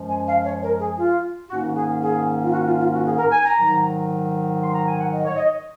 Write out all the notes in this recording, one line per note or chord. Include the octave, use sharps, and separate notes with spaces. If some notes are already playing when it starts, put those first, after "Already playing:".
Already playing: F#2 F3 G#3 C#4
G#5
F5
C#5
A#4
G#4
F4
G#2 D#3 A#3 C#4 F#4
G#4
G#4
F4
F#4
F4
F4
F#4
G#4
A#4
G#5
A#5
G#2 D#3 F#3
C6
A#5
G#5
F#5
D#5
C#5
D#5